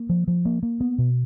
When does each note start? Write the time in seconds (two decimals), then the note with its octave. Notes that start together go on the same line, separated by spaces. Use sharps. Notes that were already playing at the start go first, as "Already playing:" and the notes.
Already playing: A#3
0.09 F3
0.28 F3
0.45 A#3
0.63 A#3
0.81 B3
0.98 B2